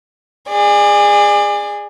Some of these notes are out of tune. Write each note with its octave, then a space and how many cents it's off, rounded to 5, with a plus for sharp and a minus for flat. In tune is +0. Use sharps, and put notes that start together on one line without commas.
G#4 -20 D5 +30